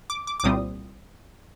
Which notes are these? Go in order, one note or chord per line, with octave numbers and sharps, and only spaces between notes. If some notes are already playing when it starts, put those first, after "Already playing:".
D6
D6
D6
C2 A#2 G3 C4 D#6